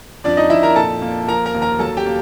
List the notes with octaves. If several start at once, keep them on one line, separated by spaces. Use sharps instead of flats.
F2 D4 D5
D#4 D#5
F2 E4 E5
A#4 A#5
A#2 A4 A5
A#3
F3 A#4 A#5
A#4 A#5
D#2
A#4 A#5
F#3 A4 A5
G4 G5
A#3